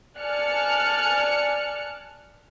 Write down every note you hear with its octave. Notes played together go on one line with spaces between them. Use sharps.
D5 G#5 A5 F6 F#6 C#7